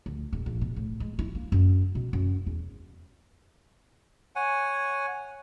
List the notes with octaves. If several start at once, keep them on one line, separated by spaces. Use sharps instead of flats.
D2
D#1
A#1
B2
A2
G#3
E4
A#3
F#2
B2
F#2
E2
C#5 F#5 G#5